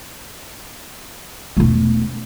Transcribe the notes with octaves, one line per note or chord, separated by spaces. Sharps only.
E1 A3